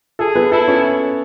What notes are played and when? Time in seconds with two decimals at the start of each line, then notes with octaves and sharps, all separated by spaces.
0.19 G#4 A4
0.35 B3 B4
0.52 E4 A4
0.68 C#4 C#5